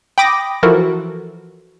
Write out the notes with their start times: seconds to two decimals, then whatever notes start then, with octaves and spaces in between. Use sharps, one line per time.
0.18 G5 B5 D6 D#6 A#6
0.63 E3 F3 F#4 A4 A#4